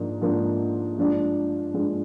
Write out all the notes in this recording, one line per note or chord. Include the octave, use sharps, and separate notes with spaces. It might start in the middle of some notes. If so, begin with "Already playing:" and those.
Already playing: G#2 F3 A#3 D4
G#2 F3 A#3 D4
G2 F3 G#3 D4
G2 F3 G#3 D4